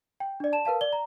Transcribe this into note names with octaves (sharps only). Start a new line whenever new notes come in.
G5
D4 D5
A5 E7
A#4 B4 F5 A5
D5 G7
A#5